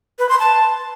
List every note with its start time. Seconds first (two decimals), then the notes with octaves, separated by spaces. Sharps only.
0.19 B4
0.29 C6
0.39 A5